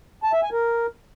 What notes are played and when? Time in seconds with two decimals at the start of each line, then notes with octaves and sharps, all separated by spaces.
0.23 A5
0.33 E5
0.43 G#5
0.52 A#4